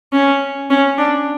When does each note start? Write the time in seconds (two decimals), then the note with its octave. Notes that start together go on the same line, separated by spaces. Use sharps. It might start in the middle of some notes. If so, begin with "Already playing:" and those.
0.13 C#4
0.70 C#4
0.98 D4